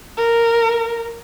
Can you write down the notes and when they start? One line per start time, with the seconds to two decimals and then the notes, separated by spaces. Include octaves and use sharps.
0.18 A#4